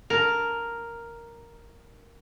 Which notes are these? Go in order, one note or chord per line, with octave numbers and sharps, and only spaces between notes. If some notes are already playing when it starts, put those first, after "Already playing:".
A#4 A5